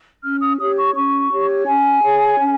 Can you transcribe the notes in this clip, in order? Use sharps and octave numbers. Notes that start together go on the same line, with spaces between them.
C#4 F6
D#6
G4 C#5 D#6
C#6
C#4 C#6
G4 C#5
C#4 G#5
G#4 C#5
C#4